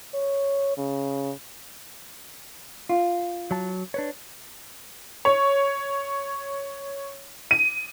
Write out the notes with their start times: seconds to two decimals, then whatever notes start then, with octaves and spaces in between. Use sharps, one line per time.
0.14 C#5
0.77 C#3
2.89 F4
3.51 F#3 A5
3.94 D4 B4 C#5
5.25 C#5
7.51 D#7